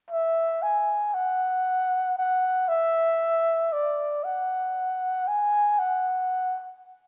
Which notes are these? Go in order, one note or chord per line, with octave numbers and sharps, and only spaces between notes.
E5
G#5
F#5
F#5
E5
D5
F#5
G#5
F#5